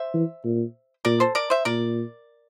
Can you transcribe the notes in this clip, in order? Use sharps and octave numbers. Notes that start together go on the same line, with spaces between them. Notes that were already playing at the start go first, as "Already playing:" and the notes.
Already playing: C5 E5
E3
A#2
A#2 A#4 D5
A4 C5
A#4 D5
C5 E5
A#2 A#4 D5